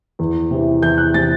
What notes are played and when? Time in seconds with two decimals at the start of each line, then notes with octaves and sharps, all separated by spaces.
0.19 E2
0.51 C3 E3
0.82 E2 G6
0.98 F#6
1.14 C3 E3 A6